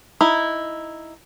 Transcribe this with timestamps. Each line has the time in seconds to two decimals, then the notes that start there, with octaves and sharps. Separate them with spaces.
0.21 D#4 E4